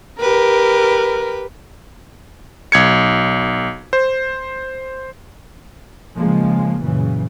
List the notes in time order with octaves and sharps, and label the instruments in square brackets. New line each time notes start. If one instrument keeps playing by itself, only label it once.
[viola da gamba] G4 B4 [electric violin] A#4
[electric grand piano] B1 G#6 C#7
C5
[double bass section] C#3 F3 G#3 A#3
F#1 A#2 C#3 E3